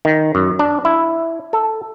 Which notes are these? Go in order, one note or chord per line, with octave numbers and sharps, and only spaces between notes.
D#3
F#2
D4
E4
A4